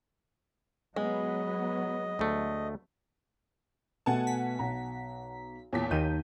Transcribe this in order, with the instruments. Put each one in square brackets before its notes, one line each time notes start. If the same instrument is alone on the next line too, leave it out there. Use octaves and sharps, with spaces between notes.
[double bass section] F#3 B3 [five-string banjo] G#3 [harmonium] D#5
[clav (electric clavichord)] D2 A3
[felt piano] B2 A3 B3 [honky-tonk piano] F#5 G#5 A5
[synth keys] B6
[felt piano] B1 A#5
[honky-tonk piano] E2 A#2 B6 [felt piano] C#5 A5
[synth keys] D#2 D#3 [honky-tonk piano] G6 D#7